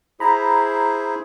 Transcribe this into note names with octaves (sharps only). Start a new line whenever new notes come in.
E4 G#4 C5 A#5 B5